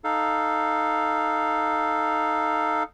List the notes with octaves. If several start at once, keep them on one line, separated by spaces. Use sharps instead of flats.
D#4 A4 F5